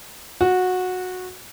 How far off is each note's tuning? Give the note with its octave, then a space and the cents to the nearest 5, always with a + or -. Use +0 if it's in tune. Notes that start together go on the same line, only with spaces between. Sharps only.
F#4 -15